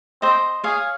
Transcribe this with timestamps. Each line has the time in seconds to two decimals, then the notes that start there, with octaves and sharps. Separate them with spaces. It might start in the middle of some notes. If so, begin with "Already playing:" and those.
0.22 C4 C5 D#5
0.64 G#4 C#5 F5